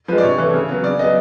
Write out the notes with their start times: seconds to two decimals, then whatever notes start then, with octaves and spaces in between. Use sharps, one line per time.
0.08 F3 G#3 B4
0.18 D5
0.23 C3 C#5
0.38 E3 A3
0.54 C#3
0.69 F#3 B3
0.84 C#3 D5
0.99 F#3 B3 D#5